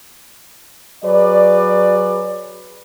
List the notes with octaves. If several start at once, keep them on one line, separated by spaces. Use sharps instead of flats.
F#3 G#4 B4 D5